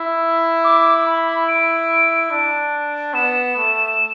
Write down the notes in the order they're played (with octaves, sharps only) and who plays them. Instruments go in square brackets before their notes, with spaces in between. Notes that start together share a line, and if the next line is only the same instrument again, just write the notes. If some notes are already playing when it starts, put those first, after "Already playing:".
Already playing: [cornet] E4
[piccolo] D6
B5
D7
[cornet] D4
[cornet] B3 [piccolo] E7
[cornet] A3